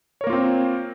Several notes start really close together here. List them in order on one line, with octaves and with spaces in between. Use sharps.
C#5 A#4 A#3 F4 C4